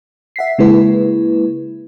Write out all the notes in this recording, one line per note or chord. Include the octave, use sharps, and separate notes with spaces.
E5 F#5 B6 C7
C#3 G#3 A#3 E4 B4